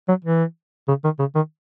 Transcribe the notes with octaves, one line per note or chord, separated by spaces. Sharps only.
F#3
E3
C#3
D#3
C#3
D#3